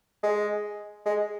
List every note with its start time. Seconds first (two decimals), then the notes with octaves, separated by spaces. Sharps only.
0.23 G#3
1.06 G#3